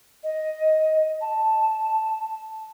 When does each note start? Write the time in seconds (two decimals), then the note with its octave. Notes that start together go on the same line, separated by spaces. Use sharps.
0.23 D#5
1.21 A5